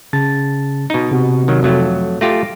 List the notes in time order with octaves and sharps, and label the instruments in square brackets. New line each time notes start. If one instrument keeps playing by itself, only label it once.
[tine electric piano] C#3 A5 A6
[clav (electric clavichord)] B2 D#4
[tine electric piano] C3 F#4
[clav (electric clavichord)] D#3 F#3
F2 F#3 A3
[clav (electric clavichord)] A3 F4 G4 [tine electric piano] A#6